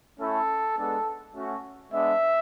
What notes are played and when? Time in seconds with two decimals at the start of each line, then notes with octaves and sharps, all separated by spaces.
0.19 A3 C#4 E4 A4
0.77 G#3 B3 D4 A4
1.35 A3 C#4 F#4
1.92 G#3 B3 D4 E5